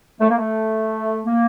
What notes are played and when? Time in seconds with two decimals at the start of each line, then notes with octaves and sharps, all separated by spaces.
0.21 A3
0.29 A#3
0.37 A3
1.26 A#3